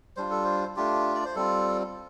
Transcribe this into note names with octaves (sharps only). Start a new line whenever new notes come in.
G3 D4 F4 C5
A4
C5
A3 D4 F4 G4
D5
C5
G3 C4 F4 A4